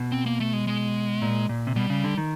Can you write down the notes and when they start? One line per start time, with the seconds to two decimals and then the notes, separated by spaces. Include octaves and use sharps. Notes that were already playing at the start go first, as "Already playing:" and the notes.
Already playing: B2
0.12 C4
0.26 A#3
0.40 A3
0.53 G#3
0.67 G#3
1.22 A#2
1.49 A#2
1.67 C3
1.76 B2 G3
1.90 C#3
2.04 D3
2.18 D#3